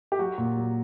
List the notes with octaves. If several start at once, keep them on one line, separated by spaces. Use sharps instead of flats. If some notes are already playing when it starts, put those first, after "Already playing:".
G4
F#3 F#4
A#2
F#3